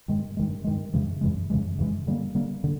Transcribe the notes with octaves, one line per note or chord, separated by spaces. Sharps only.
G2 D#3 G#3
G2 D#3 G#3
G2 D#3 G#3
F#2 C#3 E3 G#3
F#2 C#3 E3 G#3
F#2 C#3 E3 G#3
F#2 C#3 E3 G#3
D3 G3 A#3
D3 G3 A#3
D3